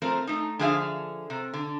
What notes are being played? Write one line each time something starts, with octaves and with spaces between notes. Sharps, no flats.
F3 A3 C4 A#4
A3 D#4
D3 F3 G#4 E5 F5
C3
D3